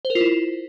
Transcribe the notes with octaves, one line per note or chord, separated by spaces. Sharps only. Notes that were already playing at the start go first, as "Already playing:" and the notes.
C5
A#4
F4
E4